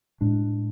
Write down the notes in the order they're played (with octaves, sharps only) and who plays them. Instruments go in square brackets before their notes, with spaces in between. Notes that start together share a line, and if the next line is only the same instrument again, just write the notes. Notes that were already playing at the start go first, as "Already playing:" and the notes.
[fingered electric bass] A2 G#3 D4